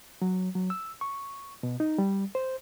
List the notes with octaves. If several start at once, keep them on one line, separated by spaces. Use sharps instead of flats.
F#3
F#3
E6
C#6
B2
D#4
G3
C5